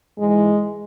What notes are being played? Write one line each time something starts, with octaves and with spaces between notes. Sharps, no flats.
G#2 E3 G#3